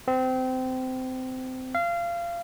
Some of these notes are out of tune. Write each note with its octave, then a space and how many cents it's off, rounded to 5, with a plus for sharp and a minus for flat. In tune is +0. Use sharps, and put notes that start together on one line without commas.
C4 -25
F5 -25